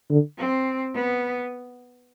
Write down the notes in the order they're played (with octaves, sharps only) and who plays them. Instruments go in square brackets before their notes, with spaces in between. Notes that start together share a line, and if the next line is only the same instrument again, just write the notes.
[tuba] D3
[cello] C4
B3